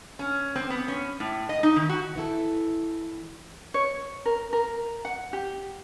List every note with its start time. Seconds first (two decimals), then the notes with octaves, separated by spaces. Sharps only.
0.19 C#4
0.55 C4
0.70 B3
0.88 C#4
1.20 A2
1.49 D#5
1.63 D#4
1.76 D#3
1.89 F#4
2.16 E3 E4 A4
3.74 C#5
4.26 A#4
4.53 A#4
5.05 F#5
5.33 G4